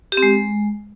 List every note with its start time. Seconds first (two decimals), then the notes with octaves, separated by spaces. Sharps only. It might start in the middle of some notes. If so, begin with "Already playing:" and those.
0.12 G4
0.17 C4
0.23 G#3